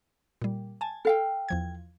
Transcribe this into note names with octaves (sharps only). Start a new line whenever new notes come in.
A#2 G3
G#5 A5
A4 F5 G5
E2 F3 G#6